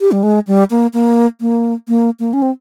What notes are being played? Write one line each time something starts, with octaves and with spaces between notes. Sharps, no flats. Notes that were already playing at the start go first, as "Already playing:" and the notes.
G4
G3
G#3
G3
A#3
A#3
A#3
A#3
A#3
C#4
C4